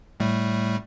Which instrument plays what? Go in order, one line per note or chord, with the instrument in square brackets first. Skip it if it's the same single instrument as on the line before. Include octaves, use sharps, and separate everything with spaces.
[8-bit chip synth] A2 G3 A3